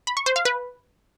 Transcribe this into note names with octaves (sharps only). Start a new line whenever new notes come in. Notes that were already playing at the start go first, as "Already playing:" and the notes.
B5
C#6
C5
F5
B4